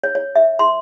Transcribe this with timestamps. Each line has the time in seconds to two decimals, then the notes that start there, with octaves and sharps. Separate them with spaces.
0.04 C#5
0.15 C#5
0.36 E5
0.59 C6